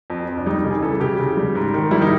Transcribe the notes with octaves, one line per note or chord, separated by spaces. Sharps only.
F2
F2
D4
G3 D#4
C#3
G#4
E3 A4
C#3 G4
C#3
G3
G#2
D#3
G3 E4
D#4